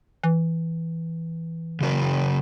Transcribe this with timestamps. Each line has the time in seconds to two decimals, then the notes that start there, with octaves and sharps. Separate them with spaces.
0.24 E3
1.81 C#3 F#3 A#4